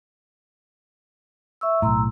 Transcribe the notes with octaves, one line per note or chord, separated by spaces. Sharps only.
E5 C#6 E6
B1 A2 A#5 C6 E6